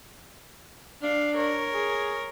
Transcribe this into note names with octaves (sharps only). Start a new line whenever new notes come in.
D4 F5
A#4 C#5
G#4